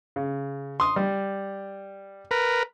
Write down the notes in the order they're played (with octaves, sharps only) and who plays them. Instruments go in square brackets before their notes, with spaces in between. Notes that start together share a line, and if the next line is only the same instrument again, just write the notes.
[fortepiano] C#3
C6 D#6
G3
[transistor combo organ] A#4 B4